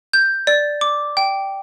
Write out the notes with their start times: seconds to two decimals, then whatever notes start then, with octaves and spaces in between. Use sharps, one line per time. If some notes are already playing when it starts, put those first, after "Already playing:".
0.13 G6
0.47 D5
0.81 D6
1.17 G5